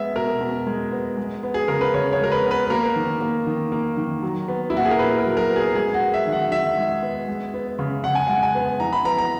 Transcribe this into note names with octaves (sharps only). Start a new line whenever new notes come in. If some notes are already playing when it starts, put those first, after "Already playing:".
Already playing: G#3 B3 E5
B2 A#4
B2
G#3
B3
G#3
B3
G#4
C#3 A#4
B4
C#3 C#5
C#5
G#3 A#4
B4
B3
B4
A#3 A#4
D#3
A#3
D#3
A#3
D#3
F#3
B3
E4
A#2 F#4
G#4
A#4
A#2 B4
A#4
F#3
A#4
B3
G#4
G#3 G#4
F#4
B3
E5
D#3
F#5
D#3 E5
G#3
B3
G#3
B3
C#3
C#3 F#5
G#5
G#3 F#5
G#5
B3
E3 A#5
B5
B3 A#5
A#5